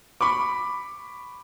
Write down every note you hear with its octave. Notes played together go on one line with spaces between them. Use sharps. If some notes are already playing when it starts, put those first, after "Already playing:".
B5 C#6 D6